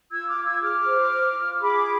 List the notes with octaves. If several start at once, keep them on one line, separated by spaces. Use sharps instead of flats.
F4 E6 G#6
D6 F6
F4
E6 G#6
G#4 D6 F6
C5
F4
F4
E6
G#4 B5 D6